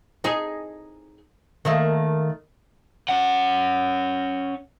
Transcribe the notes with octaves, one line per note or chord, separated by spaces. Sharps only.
D#4 G#4
D#3 A3 A#3
C#4 F#5